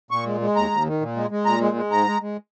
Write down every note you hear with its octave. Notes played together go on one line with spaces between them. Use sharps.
A#2 C#6
G#3
G#3
D#2 A#5
D#2
D#3
A#2
G#3
G#3
A#2 A#5
G#3
G#3
G#2 A#5
G#3
G#3